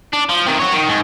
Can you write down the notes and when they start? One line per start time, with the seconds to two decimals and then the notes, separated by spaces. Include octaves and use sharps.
0.13 D4
0.29 F3
0.46 C3 D#3
0.59 F#4 C#5
0.73 D#3
0.89 G#2